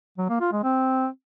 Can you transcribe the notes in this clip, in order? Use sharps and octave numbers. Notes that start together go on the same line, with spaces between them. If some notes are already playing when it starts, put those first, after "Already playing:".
F#3
A#3
F4
G#3
C4